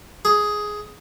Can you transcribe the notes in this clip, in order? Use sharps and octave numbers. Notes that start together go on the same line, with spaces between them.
G#4